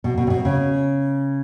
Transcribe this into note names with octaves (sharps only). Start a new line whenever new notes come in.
B2
B2
C3
B2
C#3